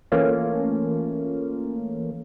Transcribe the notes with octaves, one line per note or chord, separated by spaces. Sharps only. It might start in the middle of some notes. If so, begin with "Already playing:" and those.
E3 A3 A#3 C#4 F4